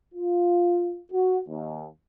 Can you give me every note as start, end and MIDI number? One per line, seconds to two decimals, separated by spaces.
0.14 0.98 65
1.12 1.40 66
1.48 1.85 39